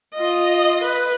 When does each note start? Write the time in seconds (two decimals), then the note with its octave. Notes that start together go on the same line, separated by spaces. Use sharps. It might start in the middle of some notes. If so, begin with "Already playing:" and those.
0.14 F4 D#5
0.83 B4